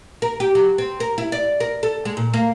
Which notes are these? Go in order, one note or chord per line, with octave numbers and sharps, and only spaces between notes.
A#4
G4
F#3
C4
A#4
E4
D5
A#4
A4
G#3
A#2
A#3